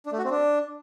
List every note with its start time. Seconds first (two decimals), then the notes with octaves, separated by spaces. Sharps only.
0.06 D4
0.12 A3
0.18 F#4
0.24 C4
0.31 D4